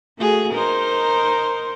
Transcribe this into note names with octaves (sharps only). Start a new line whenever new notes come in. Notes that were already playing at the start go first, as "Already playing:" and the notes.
A3 F#4 G#4
D#4 A#4 C5